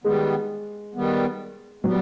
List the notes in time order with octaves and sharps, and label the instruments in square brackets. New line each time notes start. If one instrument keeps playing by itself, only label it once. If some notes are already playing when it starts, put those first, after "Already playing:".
[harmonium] D#3 G3 B3 [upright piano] G#3
[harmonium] D#3 G3 B3
[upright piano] F#3 [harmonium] G3 B3